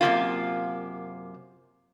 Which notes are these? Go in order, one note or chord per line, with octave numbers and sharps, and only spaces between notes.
F#2 C3 E3 A#3 F4